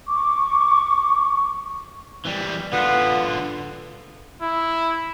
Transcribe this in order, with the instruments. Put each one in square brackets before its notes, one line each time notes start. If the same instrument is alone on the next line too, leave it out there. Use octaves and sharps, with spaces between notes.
[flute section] C#6 D6
[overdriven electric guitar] E3 G3
[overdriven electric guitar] D3 F4 [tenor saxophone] B3
[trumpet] E4